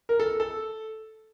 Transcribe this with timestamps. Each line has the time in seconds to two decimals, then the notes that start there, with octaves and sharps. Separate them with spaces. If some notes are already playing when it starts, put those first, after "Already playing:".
0.09 A#4
0.20 A4
0.40 A4